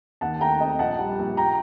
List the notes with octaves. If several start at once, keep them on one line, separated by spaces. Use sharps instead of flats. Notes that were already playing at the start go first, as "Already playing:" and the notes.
D#2 F#5 A5
A3 G5 A#5
C4 D#5 G5
A#1 F#5 A5
G3
A#1
G5 A#5